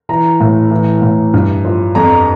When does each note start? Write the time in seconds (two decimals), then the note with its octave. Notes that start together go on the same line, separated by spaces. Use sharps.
0.09 E3 A#5
0.40 A2
0.71 E3
1.02 A2
1.34 G2
1.65 F3
1.95 F2 A#5